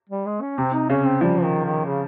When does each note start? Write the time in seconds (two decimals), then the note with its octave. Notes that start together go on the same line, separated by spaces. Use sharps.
0.10 G3
0.26 G#3
0.41 C#4
0.58 C3 C4
0.74 D#4
0.90 C#3 C#4
1.06 C4
1.21 F3 G3
1.43 D#3
1.64 D#3
1.86 C#3